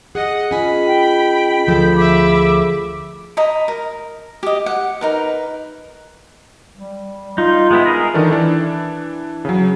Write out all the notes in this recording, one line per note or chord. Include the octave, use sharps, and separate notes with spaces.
G#4 D#5 F#5
C#4 F4 G#4 D#5 G#5 B5
G5
D2 F3 A4 G6
G#4 E5 B5 D6
D#5 A#5 B5
A#4
G4 D#5
F#5
D#4 A#4 B4
G3
D#4 F4
G#3 B3 E4
G#4 A#4 D#5
D#3 E3 D4 A4
E3 D4
C#3 F#3